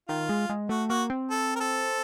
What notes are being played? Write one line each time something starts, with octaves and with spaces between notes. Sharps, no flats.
D#3 F4
G#3
G#3
A3 F#4
A#3 F#4
C4
A4
A#4
A4